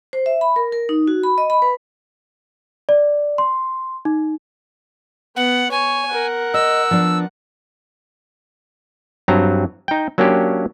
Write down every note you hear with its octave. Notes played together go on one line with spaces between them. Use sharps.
C5
E5
B5
A#4
A#4
D#4
F#4
B5
D#5
B5
B4
D5
C6
D#4
B3 F#5
C#5 G#5
A#4 F#5
D#5 E6
F3 B3 D4
G2 F#3 C4 A#5
D#4 G5
F#3 A#3 C#4 D4 G4